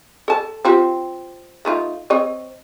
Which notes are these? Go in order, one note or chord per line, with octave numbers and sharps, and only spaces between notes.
A4 A5
C4 F4 G4
A3 D#4 F4
C4 C#5 D#5